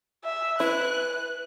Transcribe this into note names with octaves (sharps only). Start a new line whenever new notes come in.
E5
E4 B4 F#6